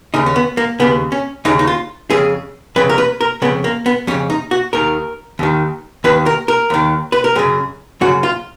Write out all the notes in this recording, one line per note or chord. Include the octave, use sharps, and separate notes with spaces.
D#2 C#3 D#4
C#4
B3
A#3
D#2 C#3 B3
C#4
D#2 C#3 D#4
D#4
F4
F2 C#3 G#4
F2 C#3 B4
A#4
B4
A#4
F2 C#3 B3
A#3
B3
F2 C#3 C#4
D#4
F#4
D#2 D#3 A#4
D#2 D#3
D#2 D#3 B4
A#4
A#4
D#2 D#3
B4
A#4
F#2 C#3 G#4
F#2 C#3 F#4
F4